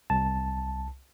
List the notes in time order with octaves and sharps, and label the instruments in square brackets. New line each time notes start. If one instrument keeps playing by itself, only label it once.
[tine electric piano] C2 A5